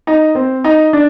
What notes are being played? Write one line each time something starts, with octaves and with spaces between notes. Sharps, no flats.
D#4
C4
D#4
D4